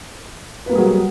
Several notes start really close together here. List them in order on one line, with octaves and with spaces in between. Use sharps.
B4 A#3 G3 G#4 F#3